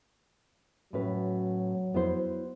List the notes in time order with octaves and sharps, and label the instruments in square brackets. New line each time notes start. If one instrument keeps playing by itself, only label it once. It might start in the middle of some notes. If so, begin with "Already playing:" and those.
[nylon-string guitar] A2 C#4 B4 [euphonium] F#3
[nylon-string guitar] B3 E4 C5